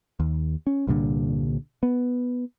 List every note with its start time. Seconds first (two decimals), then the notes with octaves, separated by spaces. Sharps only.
0.20 D#2
0.67 C#4
0.87 C2 G2 A#2 D3
1.83 B3